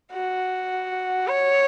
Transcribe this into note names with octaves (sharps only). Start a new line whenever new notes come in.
F#4
C#5